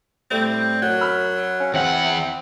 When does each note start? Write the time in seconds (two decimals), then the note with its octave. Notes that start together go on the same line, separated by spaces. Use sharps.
0.31 A2 G3 A3 C4
0.82 F#2 F#3
1.01 B5 E6 F6
1.60 C#4
1.74 E2 C4 F#5